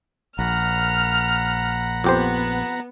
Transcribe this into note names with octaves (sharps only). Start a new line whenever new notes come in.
A#1 F#5 A#5 B5 F6
F2 B3 G4 C5